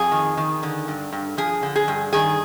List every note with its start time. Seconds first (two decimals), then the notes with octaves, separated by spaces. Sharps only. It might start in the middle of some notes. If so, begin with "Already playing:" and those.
Already playing: F2 G#4
0.12 D#3
0.37 D#3
0.63 D3
0.88 G2
1.12 G2
1.37 F3 G#4
1.63 D3
1.76 G#4
1.88 G2
2.13 D#3 G#4